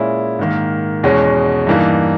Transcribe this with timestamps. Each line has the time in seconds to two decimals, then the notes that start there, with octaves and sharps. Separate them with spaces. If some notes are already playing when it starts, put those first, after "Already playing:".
Already playing: A#2 G#3 C#4 E4
0.39 G#2 D#3 A#3
1.03 E2 B2 G#3 C#4
1.67 G2 E3 A#3 D#4